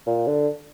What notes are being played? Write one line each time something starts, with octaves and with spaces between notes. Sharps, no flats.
A#2
D3